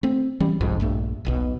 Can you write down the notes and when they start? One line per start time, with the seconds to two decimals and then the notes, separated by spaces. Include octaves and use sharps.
0.03 A3 C4
0.40 E3 G3 C#4
0.61 F#1 C2 F2 G#2
0.80 A#1 G2 A3
1.25 D#1 B1 B2